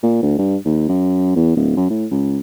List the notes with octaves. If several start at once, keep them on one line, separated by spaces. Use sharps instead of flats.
A#2
D2
G2
D#2
F#2
E2
D1
F#2
A2
C#2